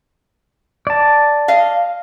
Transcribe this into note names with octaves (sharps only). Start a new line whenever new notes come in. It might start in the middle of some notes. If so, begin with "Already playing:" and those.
D5 A5
D#5 F5